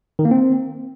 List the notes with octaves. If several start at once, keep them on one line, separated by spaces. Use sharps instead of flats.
D#3
A#3
C4